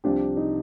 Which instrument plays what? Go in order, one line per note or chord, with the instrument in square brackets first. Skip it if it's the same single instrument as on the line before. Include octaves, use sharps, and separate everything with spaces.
[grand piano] C2 C3 F3 C4 G4 [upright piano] D4
[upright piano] D#4